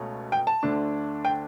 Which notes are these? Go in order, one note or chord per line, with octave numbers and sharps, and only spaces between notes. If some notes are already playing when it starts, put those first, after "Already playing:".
Already playing: C#2 B2 A3 C#4
G5
A5
D2 D3 A3 D4
G5